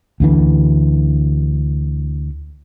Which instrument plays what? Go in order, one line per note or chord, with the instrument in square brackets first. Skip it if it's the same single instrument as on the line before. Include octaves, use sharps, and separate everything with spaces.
[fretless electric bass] D2 D3 E3